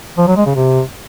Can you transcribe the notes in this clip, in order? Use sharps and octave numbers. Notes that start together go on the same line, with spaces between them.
F3
F#3
G#3
C#3
C3